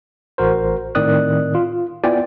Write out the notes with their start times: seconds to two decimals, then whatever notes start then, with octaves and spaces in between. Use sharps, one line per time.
0.38 A1 F#4 A#4 C5
0.95 A2 D#3 C4 D5 D#6 F#6
1.55 F4
2.04 B3 E4 F4 D5 G5 G#5